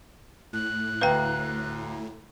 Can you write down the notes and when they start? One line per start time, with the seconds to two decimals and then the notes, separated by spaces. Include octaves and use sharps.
0.53 A2 F#6
1.01 D2 B4 F5 G5 A#5